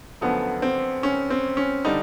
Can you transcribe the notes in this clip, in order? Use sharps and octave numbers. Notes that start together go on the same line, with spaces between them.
F#2 D3 F3 A3 B3
C4
C#4
C4
C#4
D3 G3 D#4